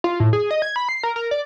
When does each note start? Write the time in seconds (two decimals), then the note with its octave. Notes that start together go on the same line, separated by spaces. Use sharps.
0.04 F4
0.20 A2
0.33 G#4
0.51 D#5
0.62 G#6
0.76 B5
0.89 C7
1.03 A#4
1.16 A#4
1.31 D5